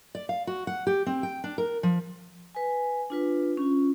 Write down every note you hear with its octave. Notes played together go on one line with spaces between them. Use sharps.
D5
F5
F#4
F#5
G4
C4
G5
D4
A#4
F3
B4 G#5
D4 F4 B4
C#4 F4